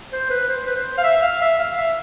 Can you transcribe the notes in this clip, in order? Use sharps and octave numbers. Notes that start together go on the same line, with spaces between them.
C5
B4
C5
B4
C5
F5
E5
F5
E5
F5
E5